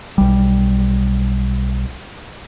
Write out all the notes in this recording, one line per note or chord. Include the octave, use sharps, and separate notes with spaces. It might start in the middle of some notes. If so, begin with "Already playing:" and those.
B1 G3